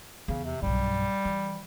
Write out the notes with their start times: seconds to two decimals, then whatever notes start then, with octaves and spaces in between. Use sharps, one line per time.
0.28 E2 C#3
0.45 C3
0.62 B1 G2 G3
1.25 E3